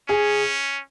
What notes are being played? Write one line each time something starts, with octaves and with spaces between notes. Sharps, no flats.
C#4 G#4